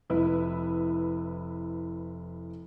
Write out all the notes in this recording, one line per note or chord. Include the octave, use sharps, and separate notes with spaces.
F1 E4 B4